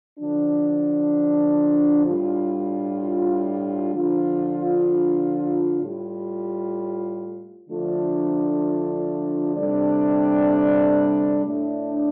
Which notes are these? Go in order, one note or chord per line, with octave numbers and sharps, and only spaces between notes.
D3 F3 D4
A2 G3 D4 F4
D3 F3 D4 F4
A2 G3 F4
D3 F3 A3 D4 F4
C3 G3 D4 A4 D5
A2 A3 D4